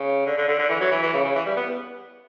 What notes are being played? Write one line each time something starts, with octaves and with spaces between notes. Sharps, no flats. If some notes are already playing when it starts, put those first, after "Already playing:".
Already playing: C#3
D3
D3
D3
D3
E3
F#3
E3
E3
C#3
C#3
E3
G3
B3